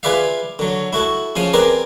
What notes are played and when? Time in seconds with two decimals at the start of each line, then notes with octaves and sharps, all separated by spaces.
0.03 F4 G#4 B4 D5 E5 F5
0.59 D3 F#3
0.93 E4 F#4 A4
1.36 C#3 F3 F5 D#6
1.53 C4 G#4 A#4 B4 D5